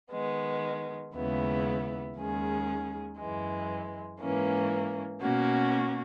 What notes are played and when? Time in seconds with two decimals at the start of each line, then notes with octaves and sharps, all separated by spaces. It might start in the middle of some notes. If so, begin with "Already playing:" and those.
0.12 D#3 G#3 B3
1.14 D#2 C#3 G#3 B3 E4
2.17 D#2 D#3 G#3 C#4 G#4
3.18 F#2 E3 G#3
4.20 G#2 E3 A#3 C#4
5.21 B2 A#3 C#4 F#4